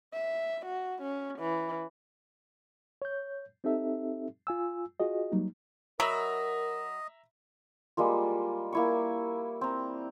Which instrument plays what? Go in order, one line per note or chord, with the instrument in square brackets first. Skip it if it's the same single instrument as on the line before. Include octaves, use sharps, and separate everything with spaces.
[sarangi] E5
F#4
C#4
E3
[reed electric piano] C#5 G6
C4 D#4 G4 A4 E5
F4 G#5 E6
F4 F#4 G#4 D#5
F#3 G3 A#3 D#4
[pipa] F#3 [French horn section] A#4 [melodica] D#5 [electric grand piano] E5 A#5 B5
[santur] G3 G#3 A#3 F4
A#3 E4 C#6
C4 A#5